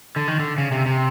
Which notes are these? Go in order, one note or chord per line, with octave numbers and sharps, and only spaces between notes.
D3
D#3
D3
C#3
C3
C3